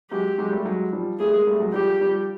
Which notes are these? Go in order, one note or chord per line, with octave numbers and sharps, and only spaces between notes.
F#3 G#3 G4
F#3 G#3
G3 A3
F#3 G#3
F3 G3
G3 A3 G#4
G#3 A#3
G3 A3
F#3 G#3
F3 G3 G4
F3 G3